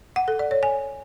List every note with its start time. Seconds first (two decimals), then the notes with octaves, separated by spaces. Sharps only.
0.16 F#5
0.28 A4
0.39 D5
0.51 C#5
0.63 G#5